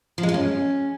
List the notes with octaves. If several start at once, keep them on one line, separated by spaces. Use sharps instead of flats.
F3
G#3
F4
C#4